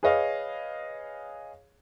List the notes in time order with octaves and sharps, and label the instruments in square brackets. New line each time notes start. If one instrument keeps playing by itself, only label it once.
[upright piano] G#4 B4 C#5 D#5 F5